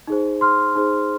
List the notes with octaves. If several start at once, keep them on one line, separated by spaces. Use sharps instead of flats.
D#4 G#4 C5
C6 F6
D#4 G#4 C5